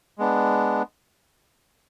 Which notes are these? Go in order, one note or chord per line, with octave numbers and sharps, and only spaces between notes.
G#3 B3 D4